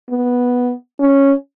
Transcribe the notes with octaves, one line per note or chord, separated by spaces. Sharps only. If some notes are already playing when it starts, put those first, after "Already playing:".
B3
C#4